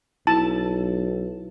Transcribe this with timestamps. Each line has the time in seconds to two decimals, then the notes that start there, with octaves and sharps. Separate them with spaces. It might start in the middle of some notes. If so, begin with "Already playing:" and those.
0.27 B1 E4 A5